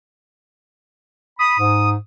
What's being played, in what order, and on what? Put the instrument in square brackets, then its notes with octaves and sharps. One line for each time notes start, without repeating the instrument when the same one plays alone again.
[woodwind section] B5 [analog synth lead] D#6
[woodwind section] G#2